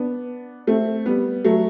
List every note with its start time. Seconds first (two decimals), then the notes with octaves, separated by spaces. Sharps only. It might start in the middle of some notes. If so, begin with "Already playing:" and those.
Already playing: B3 D4
0.67 A3 C4
1.06 G3 B3
1.44 F#3 A3